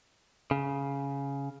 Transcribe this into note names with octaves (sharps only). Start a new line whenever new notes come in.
C#3